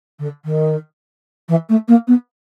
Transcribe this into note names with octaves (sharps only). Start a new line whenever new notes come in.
D3
D#3
E3
A3
A#3
B3